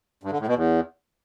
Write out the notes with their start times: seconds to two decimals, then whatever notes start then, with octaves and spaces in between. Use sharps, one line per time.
0.23 G2
0.31 D3
0.39 A2
0.47 B2
0.55 E2